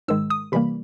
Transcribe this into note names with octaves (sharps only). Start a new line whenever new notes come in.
G#2 D#3 G#3 E6
D#6
C3 E3 G3 A#3 B5